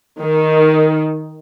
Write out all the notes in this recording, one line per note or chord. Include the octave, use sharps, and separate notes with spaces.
D#3